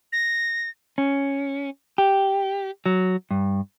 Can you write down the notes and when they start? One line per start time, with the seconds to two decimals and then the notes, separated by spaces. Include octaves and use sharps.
0.13 A#6
0.98 C#4
1.98 G4
2.86 F#3
3.31 G2